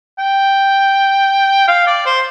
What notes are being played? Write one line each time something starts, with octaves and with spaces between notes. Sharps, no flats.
G5
F5
D5
C5